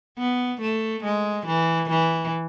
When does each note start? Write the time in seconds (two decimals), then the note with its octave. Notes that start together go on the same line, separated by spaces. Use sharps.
0.18 B3
0.61 A3
1.04 G#3
1.47 E3
1.90 E3